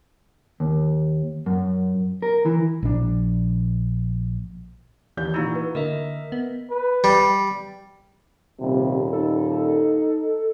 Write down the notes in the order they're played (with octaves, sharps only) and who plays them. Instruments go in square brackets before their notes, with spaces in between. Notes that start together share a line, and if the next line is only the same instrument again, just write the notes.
[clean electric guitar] D#2
F#2
A#4
E3
[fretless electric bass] A#1 D4
[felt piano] D#2 G6 [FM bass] E3
[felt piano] A#2 A#5 E6 [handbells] D#4 E4 F#4
[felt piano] B4
[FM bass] D3 [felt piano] A#3 [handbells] A#4 D#5 E5
[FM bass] B3
[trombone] B4
[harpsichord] G3
[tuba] D#1 [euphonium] C3
[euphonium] D#4 [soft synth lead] A4